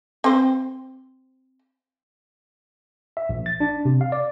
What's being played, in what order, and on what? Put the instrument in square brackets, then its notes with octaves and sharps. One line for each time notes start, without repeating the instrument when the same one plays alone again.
[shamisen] C4 C5
[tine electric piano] E5
A#1
A6
D4
C3
F5
D5